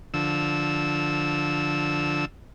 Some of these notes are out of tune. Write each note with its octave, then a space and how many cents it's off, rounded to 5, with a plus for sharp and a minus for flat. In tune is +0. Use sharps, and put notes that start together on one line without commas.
D3 +0 F3 +0 E6 -15